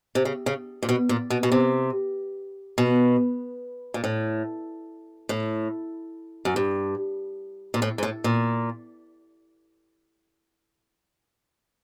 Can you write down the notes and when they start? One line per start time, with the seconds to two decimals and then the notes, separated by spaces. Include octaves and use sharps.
0.15 C3
0.25 C#3
0.46 C#3
0.83 A#2
0.89 B2
1.09 A#2
1.30 B2
1.43 B2
1.52 C3
2.78 B2
3.94 A#2
4.04 A2
5.29 A2
6.45 F#2
6.56 G2
7.74 A#2
7.82 A2
7.98 G#2
8.03 A2
8.24 A#2